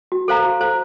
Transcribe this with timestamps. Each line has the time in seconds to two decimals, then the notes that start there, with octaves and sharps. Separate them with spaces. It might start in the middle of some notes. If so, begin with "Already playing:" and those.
0.12 F#4
0.28 A4 C5 F5 A#5
0.45 F#4
0.61 A4 C5 F5 A#5